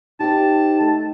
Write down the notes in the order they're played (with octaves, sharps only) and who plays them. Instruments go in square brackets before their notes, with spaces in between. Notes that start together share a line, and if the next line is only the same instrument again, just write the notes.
[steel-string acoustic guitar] C4 G4 [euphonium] D#4 [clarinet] A5
[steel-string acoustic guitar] A3